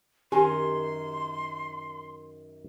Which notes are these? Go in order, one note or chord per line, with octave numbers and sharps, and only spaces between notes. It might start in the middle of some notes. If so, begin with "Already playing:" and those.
F#2 D#3 G4 G#5 C6